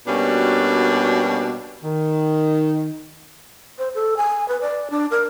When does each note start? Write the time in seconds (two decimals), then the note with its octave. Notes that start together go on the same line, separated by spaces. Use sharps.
0.07 B2 G3 A#3 C#4 D4 F#4
1.84 D#3
3.79 C5
3.95 A4
4.17 G#5
4.49 B4
4.61 D5
4.90 D4
5.11 A#4